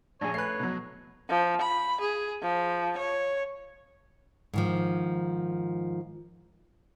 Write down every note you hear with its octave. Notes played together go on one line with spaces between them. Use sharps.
A#1 D4 G#4 C#5
A3 B4 F#6 C7
B2 F#3
F3
B5
G#4
F3
C#5
G#2 D#3 F3